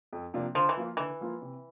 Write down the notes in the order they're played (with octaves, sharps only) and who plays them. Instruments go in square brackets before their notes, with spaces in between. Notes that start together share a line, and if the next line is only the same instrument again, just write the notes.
[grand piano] F2
C3 F3 A#3 D4
[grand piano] D3 [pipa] F3
[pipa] E3
[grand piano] F3 A#3 F4
[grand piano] D3 [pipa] E3
[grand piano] F3 A#3 F4
C3